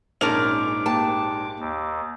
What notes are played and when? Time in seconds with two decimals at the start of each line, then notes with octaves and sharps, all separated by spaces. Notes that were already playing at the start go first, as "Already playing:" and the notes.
0.21 A#1 G#2 C#4 A#4 A5 D6 F7
0.86 A#3 G4 A5
1.59 D#2